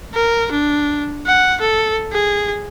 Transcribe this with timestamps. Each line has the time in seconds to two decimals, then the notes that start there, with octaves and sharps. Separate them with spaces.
0.14 A#4
0.51 D4
1.27 F#5
1.61 A4
2.13 G#4